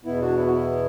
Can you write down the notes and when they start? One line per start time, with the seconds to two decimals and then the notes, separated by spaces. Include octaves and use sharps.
0.05 E2 B2 B3 E4
0.21 D4 F#4
0.37 B3 E4
0.47 F#4
0.52 B3 E4